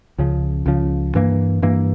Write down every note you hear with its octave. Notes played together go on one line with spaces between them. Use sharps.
C#2 C#3 F3
C#2 C#3 F3
G2 E3 A#3
G2 E3 A#3